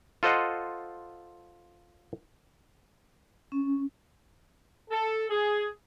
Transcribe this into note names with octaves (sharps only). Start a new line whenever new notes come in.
F4 A4 C5 D#5 F#5
C#4
A4
G#4